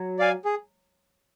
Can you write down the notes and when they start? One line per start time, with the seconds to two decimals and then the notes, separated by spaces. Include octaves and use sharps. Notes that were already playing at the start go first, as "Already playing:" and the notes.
Already playing: F#3
0.19 D5 F5 G#5
0.45 G#4